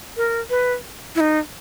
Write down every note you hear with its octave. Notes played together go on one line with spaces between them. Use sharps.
A#4
B4
E4
D#4